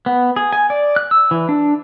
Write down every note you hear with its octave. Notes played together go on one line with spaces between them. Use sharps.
B3
G#4
G#5
D5
F#6
E6
E3
D4